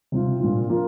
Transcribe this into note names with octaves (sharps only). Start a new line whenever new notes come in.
C3 G3 C4 F4
A#2 G3 D4 F4
F3 A#3 F4